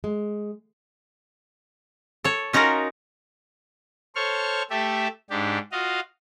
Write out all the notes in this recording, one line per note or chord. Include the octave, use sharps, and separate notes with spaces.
G#3
A4 C#5
C#4 D#4 F4 F#4 A#4
A4 C5 C#5 C#6 F6
A3 G4 A4 E5
G#2 D4 G4
F4 F#4 D#5 F5